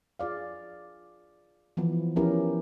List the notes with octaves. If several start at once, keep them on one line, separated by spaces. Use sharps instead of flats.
F4 G#4 D5 F5
E3 F3 B3
F3 B3 C#4 E4 G4 A#4